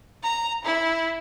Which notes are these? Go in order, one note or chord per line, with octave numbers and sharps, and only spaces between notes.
A#5
E4